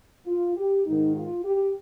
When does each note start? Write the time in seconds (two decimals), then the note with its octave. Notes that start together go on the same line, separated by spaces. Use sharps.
0.27 F4
0.56 G4
0.85 G#2 D#3 D#4
1.15 F4
1.45 G4